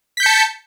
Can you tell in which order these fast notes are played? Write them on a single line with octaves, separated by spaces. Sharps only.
B6 G6 C#7 A5